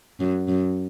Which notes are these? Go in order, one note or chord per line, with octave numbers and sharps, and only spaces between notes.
F#2
F#2